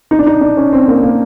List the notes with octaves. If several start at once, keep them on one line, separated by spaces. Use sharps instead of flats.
D#4
D4
D#4
D4
C#4
C4
A#3
A#3